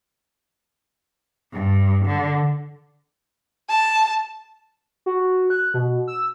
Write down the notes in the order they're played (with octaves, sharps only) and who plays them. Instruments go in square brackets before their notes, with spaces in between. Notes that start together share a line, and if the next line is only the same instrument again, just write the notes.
[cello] G2
D3
[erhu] A5
[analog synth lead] F#4
F#6
B2
E6